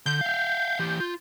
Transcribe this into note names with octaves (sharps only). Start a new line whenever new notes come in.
D3 G6
E5 F5
E3 G4
F4